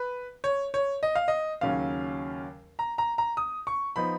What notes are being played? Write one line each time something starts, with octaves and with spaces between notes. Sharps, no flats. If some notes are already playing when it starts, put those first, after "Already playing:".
Already playing: B4
C#5
C#5
D#5
F5
D#5
D#2 C#3 F#3 C#4 F5
A#5
A#5
A#5
D#6
C#6
F3 B3 D#4 B5